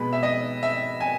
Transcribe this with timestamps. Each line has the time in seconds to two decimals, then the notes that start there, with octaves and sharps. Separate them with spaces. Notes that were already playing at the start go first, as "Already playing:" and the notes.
Already playing: B2 G#3 B3 B4
0.13 E5
0.23 D#5
0.63 E5
1.01 G#5